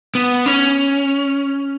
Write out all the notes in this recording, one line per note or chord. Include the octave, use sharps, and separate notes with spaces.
B3
C#4